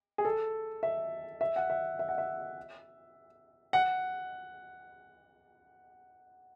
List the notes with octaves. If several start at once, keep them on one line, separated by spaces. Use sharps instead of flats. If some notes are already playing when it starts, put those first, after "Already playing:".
G#4
A4
E5
E5
F#5
E5
E5
F#5
E5
F#5